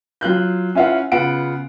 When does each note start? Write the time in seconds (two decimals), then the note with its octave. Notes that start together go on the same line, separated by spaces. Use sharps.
0.21 F#3 F4 F#6 G6
0.75 C#4 E4 F4 B4 F#5
1.12 C#3 B3 F4 F#5 D7